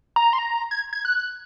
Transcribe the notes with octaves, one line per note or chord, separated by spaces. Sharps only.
A#5
C6
A#5
G#6
G#6
F#6